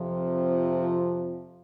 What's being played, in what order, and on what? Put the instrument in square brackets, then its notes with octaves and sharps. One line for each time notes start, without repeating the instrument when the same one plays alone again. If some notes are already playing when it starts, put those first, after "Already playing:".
Already playing: [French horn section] F2 C3 F3